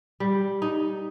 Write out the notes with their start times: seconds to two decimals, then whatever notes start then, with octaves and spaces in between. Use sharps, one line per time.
0.20 G3
0.62 D#4